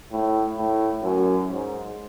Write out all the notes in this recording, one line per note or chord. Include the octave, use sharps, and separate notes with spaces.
A2
A2
F#2
G#2